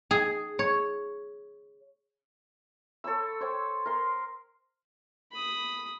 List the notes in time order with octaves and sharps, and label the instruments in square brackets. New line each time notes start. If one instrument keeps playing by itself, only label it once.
[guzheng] G#4
C#5
[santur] A4 C#5 B5 E6
C5 C#5 G5
A#4 C6
[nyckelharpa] B5 D#6